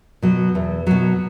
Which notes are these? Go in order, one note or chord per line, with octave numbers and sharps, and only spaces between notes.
B2 F#3
E2
B2 F#3